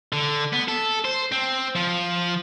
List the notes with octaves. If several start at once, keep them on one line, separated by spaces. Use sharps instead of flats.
D3
B3
A4
C5
C4
F3